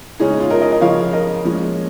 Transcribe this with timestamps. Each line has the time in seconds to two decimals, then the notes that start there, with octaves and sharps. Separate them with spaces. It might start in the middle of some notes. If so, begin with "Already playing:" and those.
0.19 C#3 G#3 C#4 D#4 G#4
0.31 D#4
0.40 F4
0.50 A#4 D#5
0.62 A#4 D#5
0.72 A#4 D#5
0.81 C#3 F3 C#4 C#5 F5
1.13 A#4 D#5
1.44 A#2 F3 G#3 C#4